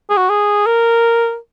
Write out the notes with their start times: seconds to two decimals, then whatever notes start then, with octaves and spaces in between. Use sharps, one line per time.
0.10 G#4
0.17 F#4
0.30 G#4
0.66 A#4